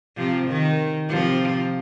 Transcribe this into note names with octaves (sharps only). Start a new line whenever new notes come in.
C3 F3
D#3
C3 F3